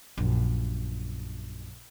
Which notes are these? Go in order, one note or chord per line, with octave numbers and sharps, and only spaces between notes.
A#1 F#2